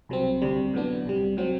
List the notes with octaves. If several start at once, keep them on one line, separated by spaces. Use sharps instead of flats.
C2 C3 F#3 C4
D2 C3 G3
A2 F#3 B3 D4
C2 C3 G3
A2 F#3 C4